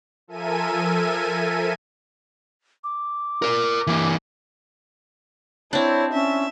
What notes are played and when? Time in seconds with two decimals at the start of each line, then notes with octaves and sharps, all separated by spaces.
0.28 F3 A4 A#4 E5 G#5 D#7
2.84 D6
3.42 A#4 D5
3.87 E3 A#3
5.73 C4 D4 E4 C#5
6.14 C#4 E5